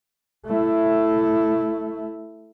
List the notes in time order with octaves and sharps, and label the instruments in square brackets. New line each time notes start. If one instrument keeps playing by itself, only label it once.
[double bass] A3 E4